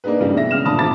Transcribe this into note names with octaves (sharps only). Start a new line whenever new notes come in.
A#3 D4 D#4 G#4 B4
G2 C#3 E3 G3 A3
B2 E5 A#6
C#3 G#3 F6 E7
G1 A#2 D4 A5 B5 D#6
G#1 G#2 A5 D6 A6